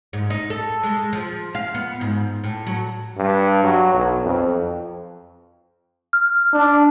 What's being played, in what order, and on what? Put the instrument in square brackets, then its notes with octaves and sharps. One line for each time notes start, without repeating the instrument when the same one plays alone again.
[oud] G#2
D#4
A4
G#3
F3
F5
B3
G#2
A2
F#3
[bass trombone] G2
F#3
B1
F2
[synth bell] F6
[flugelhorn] D4